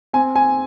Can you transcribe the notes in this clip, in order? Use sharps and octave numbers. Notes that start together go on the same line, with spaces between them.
C4 G#5
G#5